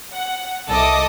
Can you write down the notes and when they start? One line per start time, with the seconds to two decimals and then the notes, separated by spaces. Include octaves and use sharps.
0.12 F#5
0.69 C2 A4 D#5 E5 D6 D#6